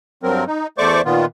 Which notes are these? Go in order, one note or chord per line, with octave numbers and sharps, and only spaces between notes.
G2 F#3 C4 A#4
D#4
E2 A3 C5 D5 C#6 D6
A#2 D#3 B3 F4